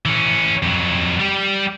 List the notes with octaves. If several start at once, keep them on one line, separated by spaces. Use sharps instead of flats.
E3 C#4
F2 F#3
G3 G4